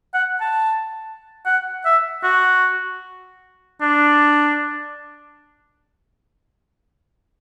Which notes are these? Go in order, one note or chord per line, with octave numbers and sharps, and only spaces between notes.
F#5
A5
F#5
E5
F#4
D4